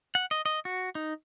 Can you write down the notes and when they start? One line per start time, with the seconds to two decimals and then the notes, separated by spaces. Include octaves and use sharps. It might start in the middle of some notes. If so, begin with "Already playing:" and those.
0.15 F#5
0.31 D#5
0.46 D#5
0.65 F#4
0.95 D#4